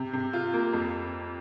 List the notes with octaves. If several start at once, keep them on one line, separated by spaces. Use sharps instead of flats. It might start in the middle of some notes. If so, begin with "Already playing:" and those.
Already playing: C3
C3
F4
A#3
F2